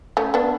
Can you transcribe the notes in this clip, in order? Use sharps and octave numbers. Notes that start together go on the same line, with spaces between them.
A3 C#4
B3 D4